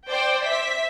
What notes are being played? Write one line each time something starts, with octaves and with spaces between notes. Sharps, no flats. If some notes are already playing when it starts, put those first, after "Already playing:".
C5 D5 G5
E5 B6